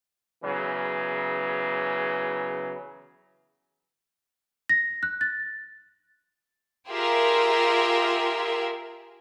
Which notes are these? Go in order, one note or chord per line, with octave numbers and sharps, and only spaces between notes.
E2 C#3 E3 F#3
A#6
F#6
A6
F4 G4 G#4 A#4 E5